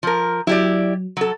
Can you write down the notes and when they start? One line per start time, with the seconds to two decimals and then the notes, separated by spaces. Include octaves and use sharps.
0.03 F3 A#4
0.47 F#3 E4 G4 D5
1.17 F#3 A4